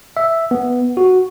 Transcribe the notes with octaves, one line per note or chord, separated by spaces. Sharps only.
E5
B3
F#4